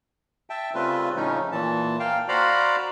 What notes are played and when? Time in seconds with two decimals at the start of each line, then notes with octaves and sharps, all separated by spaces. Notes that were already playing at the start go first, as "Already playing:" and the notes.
0.50 E5 G5 A5
0.75 C#3 G3 A3 C4 F4 B4
1.16 A2 C#3 F3 A3 C#4 D#4
1.52 A#2 E3 A5
2.00 A#3 F5 G5
2.28 F#4 C5 D5 F5 A#5 B5